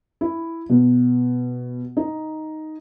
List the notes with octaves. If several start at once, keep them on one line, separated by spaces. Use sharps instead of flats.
E4
B2
D#4